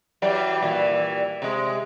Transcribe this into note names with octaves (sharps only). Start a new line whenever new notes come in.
E3 F#3 G3
A#2 E3 G3
C3 G#3